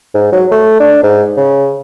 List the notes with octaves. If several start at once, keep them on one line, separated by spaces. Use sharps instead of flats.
G#2
F#3
A3
D4
G#2
C#3